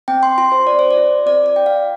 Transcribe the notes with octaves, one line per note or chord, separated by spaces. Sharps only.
C4 G5
C6
F4 C6
C5
C4 D5
C5
D5
F4
C4 D5
D5
F4 G5
F5